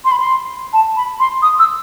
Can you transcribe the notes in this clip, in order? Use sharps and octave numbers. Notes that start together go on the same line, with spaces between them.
C6
B5
C6
A5
B5
C6
D#6
E6